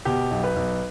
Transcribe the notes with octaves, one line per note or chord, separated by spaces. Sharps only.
B2 G4
B1
B4
B1